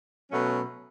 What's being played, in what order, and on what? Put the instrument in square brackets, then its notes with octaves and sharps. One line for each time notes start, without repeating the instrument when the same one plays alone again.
[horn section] B2 F#3 A3 C#4